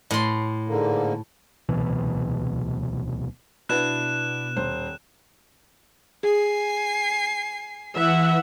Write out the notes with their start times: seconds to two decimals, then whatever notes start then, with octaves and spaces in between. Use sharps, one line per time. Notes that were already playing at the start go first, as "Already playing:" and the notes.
0.11 A2 C6
0.68 G#2 D3 A#3
1.69 D1 C2 B2 E3
3.69 B2 B3 D4 E4 F#6 E7
4.56 D#1 C5
6.23 G#4 G#5 C7
7.96 E3 E5 F#5